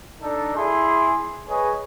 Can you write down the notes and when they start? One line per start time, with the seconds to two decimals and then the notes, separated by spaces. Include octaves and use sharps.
0.21 D4 D#4 A4
0.56 E4 G#4 G#5 C6
1.48 G#4 B4 C#5 D#5 G#5